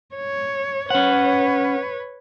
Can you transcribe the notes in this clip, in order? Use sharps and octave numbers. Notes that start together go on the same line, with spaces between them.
C#5
C#4 B4 C#5 F#5